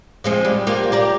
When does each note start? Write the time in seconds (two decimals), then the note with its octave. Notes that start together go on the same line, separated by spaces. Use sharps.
0.24 F3 G#3 C4
0.45 G3
0.67 A#3 F4 G4
0.92 G4 A#4 D5